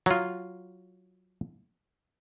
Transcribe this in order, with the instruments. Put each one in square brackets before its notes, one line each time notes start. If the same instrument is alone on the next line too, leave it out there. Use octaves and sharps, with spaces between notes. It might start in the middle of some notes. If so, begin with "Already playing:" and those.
[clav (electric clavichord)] F#3 F4